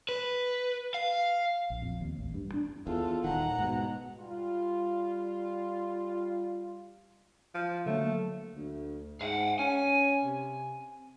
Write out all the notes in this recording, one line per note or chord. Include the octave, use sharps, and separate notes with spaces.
B4
F5
A#1
F2
D#2
A1
G2
D4
E2 F4 A4
D#1 D#3 F#5 A#5
G#2 B2
G3 F4
F3 D7
D3 F#3 A3 A#3
D2
G#2 F5 F#5
C#4 G#5
C3